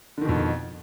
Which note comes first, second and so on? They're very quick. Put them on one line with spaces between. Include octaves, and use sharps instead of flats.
D3 D#3 B2 F2